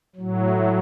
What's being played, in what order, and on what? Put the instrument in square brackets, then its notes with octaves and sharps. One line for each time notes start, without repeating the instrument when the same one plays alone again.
[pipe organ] A2 F#3
A3